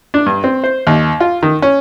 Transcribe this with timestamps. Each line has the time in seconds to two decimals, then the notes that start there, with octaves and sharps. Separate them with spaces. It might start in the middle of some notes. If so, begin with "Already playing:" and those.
0.14 D4
0.26 G2
0.44 C4
0.64 C5
0.87 D#2
1.20 F4
1.43 D#3
1.62 C#4